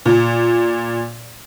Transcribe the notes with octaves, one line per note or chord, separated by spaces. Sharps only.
A#2